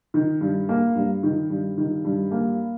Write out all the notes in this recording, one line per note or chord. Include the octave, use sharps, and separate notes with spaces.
D#3
G2
A#3
G2
D#3
G2
D#3
G2
A#3